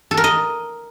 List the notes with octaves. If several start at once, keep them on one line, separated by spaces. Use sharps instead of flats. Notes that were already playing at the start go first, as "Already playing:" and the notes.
A4
A#4
D#5